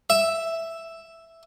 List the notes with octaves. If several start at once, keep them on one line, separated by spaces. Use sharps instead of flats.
E5